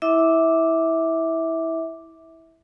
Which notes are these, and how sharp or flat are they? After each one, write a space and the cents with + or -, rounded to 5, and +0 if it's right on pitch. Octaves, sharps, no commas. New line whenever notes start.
E4 -15 E5 -20 D6 +0